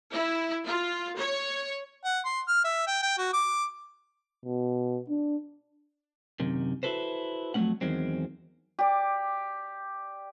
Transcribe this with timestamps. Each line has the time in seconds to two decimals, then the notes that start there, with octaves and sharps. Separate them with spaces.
0.12 E4
0.64 F4
1.17 C#5
2.05 F#5
2.25 C6
2.48 F6
2.64 E5
2.87 G5
3.03 G5
3.18 F#4
3.33 D6
4.45 B2
5.09 D4
6.40 F#2 C3 D#3
6.83 E4 F#4 A4 B4 C5
7.54 F2 F#3 G#3 A3 C#4 F#5
7.81 E2 D#3 F#3 G#3 C4
8.79 G4 D5